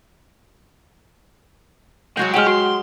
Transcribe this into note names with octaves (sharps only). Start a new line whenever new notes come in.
F#3 G#3 F#4 G5
F#3 G#3 G4 F#5 G5 F6
F#4 C6